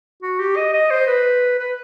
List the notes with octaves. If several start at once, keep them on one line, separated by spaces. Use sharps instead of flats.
F#4
G4
D#5
D#5
C5
B4
B4